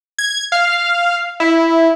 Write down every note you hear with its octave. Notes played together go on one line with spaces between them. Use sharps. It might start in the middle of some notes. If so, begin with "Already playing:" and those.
G#6
F5
E4